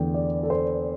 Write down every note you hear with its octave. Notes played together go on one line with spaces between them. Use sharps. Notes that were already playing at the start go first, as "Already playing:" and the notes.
Already playing: E2 D3 A3 G5
D5
A4
C5